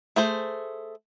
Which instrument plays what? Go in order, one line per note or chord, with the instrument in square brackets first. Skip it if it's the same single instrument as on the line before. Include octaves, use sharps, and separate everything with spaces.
[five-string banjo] A3 G#4 C5